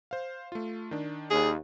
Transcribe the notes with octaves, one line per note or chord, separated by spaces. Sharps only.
C5 F5
A3 F4
D#3 D4
D#2 G#4